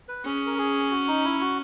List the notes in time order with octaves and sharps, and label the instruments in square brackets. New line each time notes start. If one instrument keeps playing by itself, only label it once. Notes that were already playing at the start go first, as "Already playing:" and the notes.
[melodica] B4
[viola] C#4 [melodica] G#4
[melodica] A#4
G#4
F#4
D#4
E4
F#4